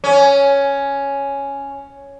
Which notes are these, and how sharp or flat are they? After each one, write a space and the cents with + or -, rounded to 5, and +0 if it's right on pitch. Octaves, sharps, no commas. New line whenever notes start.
C#4 +5